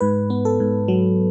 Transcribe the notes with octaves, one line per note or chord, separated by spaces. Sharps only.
G#2 B4
B3
A4
G#2
F#3